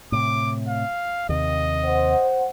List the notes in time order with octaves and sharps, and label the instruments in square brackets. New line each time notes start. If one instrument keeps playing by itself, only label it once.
[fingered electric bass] A2 C3 [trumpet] D6
[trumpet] F5
[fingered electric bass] D#2 C3 [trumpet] D#5
[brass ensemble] C5 F#5